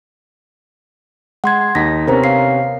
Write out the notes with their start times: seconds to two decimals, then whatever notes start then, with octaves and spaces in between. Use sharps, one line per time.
1.44 G#3 F#5 C6 G#6
1.75 D#2 D#4 A#6 B6
2.07 C3 B3 C#4 A#4 C5 A#5
2.24 F5 C7